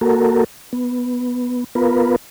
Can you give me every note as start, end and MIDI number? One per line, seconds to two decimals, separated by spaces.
0.01 0.44 58
0.01 0.44 66
0.01 0.44 69
0.01 0.44 70
0.73 1.64 59
1.75 2.16 59
1.75 2.16 65
1.75 2.16 70
1.75 2.16 71